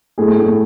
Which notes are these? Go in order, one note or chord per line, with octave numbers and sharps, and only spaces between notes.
A2 G#4
A2